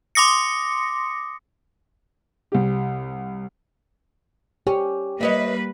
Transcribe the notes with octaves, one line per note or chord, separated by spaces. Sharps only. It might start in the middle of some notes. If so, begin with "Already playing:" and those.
C6 D6 D#6 A#6 C#7
C2 G4
C#4 G4
G3 A#3 B4 C#5 D#5 E5